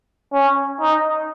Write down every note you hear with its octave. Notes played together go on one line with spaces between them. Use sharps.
C#4
D#4